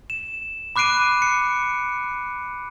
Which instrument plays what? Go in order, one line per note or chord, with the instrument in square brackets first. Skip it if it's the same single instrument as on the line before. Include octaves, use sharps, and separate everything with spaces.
[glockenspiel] E7
B5 D6 F#6 C7 D7 D#7
C#7